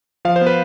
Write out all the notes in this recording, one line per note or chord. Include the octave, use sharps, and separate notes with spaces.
F3 F5
C5
B3
B4